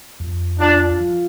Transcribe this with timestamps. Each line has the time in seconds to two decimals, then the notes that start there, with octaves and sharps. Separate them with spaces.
0.20 F2
0.60 D4 F4
1.00 F3